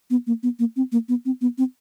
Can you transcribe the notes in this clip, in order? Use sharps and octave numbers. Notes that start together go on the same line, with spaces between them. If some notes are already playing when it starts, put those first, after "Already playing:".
B3
A#3
B3
A#3
C4
A#3
B3
C4
B3
C4